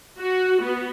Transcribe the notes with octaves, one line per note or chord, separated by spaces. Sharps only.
F#4
B3